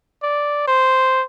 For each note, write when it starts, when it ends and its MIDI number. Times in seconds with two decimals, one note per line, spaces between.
0.23 0.63 74
0.67 1.23 72